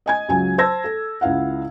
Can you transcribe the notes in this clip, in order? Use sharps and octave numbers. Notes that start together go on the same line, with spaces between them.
D#5 G#5 G#6
C#2 F#3 G#5
C5 A5 E6 G#6 A#6
A4
C#2 E4 F5 F#5